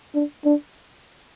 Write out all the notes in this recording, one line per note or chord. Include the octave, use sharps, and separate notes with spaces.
D4
D4